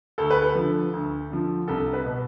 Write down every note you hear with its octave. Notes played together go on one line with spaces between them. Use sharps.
D2 A4
B4
A4
D3 F3
D2
D3 F3
C2 A4
B4
B2